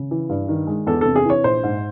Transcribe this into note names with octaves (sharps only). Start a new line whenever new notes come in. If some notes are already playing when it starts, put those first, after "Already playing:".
Already playing: C#3
E3
G2
D#3
G#3
E2 A4
C3 A4
G#4
E3 C#5
A#1 C5
G#2